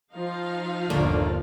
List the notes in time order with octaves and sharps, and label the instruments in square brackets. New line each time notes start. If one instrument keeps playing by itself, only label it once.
[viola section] F3 D#4 F5
[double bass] G1 D#2 [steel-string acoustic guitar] A#2 A3 A#3 [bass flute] D3